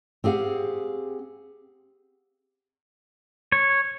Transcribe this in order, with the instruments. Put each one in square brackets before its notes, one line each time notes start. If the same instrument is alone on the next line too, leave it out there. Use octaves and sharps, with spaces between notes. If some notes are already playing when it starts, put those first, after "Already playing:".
[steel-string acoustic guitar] C4 G4 G#4 F5 F#5
[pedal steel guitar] C#5